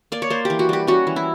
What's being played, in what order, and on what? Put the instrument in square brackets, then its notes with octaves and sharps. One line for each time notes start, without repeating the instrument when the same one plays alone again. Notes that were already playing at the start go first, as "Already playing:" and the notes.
[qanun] A#3 D5
C#5
A#3 C5
E3 G4
F#4
G3 G4
C#4 F#4
E3
E4